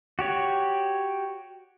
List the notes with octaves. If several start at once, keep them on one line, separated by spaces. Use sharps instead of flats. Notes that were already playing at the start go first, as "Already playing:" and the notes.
F#4 G4 C#5